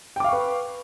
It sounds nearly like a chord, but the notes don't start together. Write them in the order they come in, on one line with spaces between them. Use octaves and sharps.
G5 D6 F5 C#6 B4